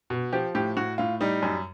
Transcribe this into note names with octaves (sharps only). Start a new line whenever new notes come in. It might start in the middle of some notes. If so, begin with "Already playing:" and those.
B2
F3 G4
A2 G4
A2 F#4
A2 F4
G3 D#4
F#2